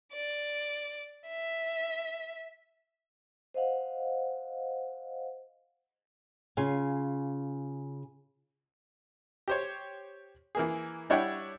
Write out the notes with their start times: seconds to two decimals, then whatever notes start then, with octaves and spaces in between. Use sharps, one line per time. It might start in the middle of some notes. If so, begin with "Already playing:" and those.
0.13 D5
1.28 E5
3.54 C5 D#5 F5 F#5
6.57 C#3 F4 G#5
9.48 G4 C5 C#5
10.55 E3 A#3 G#4
11.10 G3 D4 E4 C#5 F#5 G5